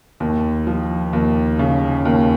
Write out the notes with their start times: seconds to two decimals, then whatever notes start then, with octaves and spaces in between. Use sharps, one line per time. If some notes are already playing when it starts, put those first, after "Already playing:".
0.20 D#2
0.67 F3
1.13 D#2
1.59 C#3
2.05 D#2